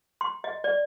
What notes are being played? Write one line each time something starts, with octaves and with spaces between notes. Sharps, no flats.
C6
D#5
D5